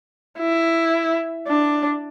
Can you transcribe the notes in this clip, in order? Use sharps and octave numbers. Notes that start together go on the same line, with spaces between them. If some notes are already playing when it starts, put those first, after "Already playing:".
E4
D4